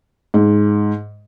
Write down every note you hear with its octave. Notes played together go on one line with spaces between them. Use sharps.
G#2